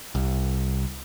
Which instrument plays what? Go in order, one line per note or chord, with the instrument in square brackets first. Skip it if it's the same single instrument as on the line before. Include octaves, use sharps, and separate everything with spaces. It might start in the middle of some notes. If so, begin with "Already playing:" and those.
[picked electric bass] C2